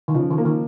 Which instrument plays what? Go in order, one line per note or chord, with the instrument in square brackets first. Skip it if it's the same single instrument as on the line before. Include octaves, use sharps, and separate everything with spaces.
[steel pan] D#3
[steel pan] C#3 [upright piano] F3
[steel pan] D#3
[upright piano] A#3
[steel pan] D#3